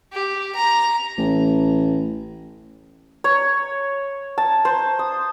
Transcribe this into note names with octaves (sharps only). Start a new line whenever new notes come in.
G4
A#5
A1
C#5
A5
C5
D#6